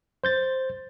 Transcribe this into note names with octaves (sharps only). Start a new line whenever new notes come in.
C5 G6 A6